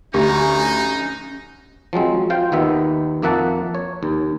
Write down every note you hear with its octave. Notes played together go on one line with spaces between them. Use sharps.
D2 C#4 D#4 G4 A#5
F3 F#3 G#3 C4
F4 C5 F5 G5
D#2 D#3 B3 E5
F2 A#3 E5 F#5 A5
C#5
D#2